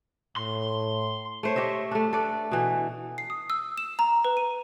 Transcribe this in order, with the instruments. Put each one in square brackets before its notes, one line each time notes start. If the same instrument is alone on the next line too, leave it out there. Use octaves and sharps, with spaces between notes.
[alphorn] A2 [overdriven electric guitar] C6
[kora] A3 C5 C#5
G4 C#5 D#5 E5
A3 D4
A4 B4 D5
B2 E3
[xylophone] C7
D#6
E6
E7
A#5
B4
D#7